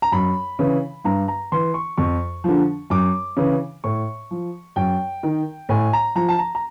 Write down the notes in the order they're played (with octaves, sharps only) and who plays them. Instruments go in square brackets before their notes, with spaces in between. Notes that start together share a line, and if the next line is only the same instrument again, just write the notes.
[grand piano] A#5
F#2 B5
C#3 E3
G2 A#5
A#5
E3 C6
C#6
F2 C#6
D3 F3
F#2 D6
C#3 E3
A2 C#6
F3
F#2 G5
D#3
A2 G#5
A#5
F3 A#5
A5
A#5
A#5